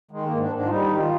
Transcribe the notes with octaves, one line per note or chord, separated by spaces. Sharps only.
D#3 G#3
A#3
G#2
D4
G#2 D4
F4
G3 D#4
D#3
G4
F4